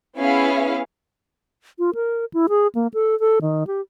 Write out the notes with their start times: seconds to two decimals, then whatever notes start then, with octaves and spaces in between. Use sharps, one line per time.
0.18 B3 C#4 E4 G#4 F5
1.79 F4
1.95 A#4
2.34 E4
2.49 G#4
2.75 A#3
2.94 A4
3.20 A4
3.42 D#3
3.67 G4